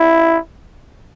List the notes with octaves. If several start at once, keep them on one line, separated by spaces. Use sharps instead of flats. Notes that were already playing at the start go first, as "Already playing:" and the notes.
Already playing: E4